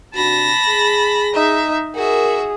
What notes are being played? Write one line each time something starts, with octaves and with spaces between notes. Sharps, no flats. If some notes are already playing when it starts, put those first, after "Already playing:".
C3 D4 F#4 A5 B5 A#6
G#4
D#4 E5
F#4 G#4 A#4 E5